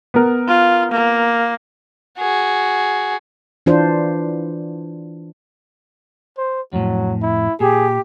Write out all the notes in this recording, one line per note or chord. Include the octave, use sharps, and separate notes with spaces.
B3 A#4
F4
A#3
F#4 G#4
E3 D4 F4 C5
C5
F2 A2 F#3
E4
A#2 G4 G#4